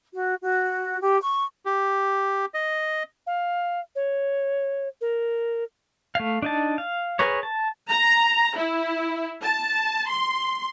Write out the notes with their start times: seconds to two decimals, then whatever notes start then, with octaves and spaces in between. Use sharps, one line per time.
0.14 F#4
0.42 F#4
1.01 G4
1.22 C#6
1.66 G4
2.54 D#5
3.26 F5
3.95 C#5
5.01 A#4
6.15 A3 F5
6.42 D4 D#4 A5
6.78 F5
7.19 G#4 A#4 B4 C#5
7.43 A5
7.89 A#5
8.56 E4
9.42 A5
10.08 C6